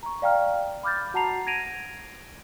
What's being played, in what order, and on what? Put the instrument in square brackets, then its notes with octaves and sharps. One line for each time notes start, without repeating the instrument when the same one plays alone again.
[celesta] A#5 C#6
D5 F5 G5 A#5 F6
B5 D6 F6 G6 A6
F#4 F#5 A5 A#5 C7 F7
G#6 A#6 D7 D#7 F7